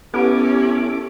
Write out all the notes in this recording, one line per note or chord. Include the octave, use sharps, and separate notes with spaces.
B3 C#4 E4 G4 A4 D6